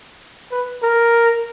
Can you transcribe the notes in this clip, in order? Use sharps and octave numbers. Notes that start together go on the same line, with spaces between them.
B4
A#4